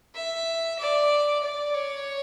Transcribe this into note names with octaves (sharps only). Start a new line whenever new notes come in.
E5
D5
D5
C#5